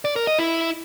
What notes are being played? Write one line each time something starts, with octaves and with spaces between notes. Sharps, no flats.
D5
A#4
D#5
E4